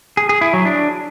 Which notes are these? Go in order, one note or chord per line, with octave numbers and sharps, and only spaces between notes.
G#4
G#4
E4
F#3
D4